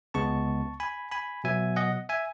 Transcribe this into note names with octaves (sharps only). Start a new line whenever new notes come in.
C#2 C#3 G#3 B3 A5 C#6
G#5 B5
G#5 B5
B2 F#3 B3 E5 G#5
D#5 F#5
E5 G#5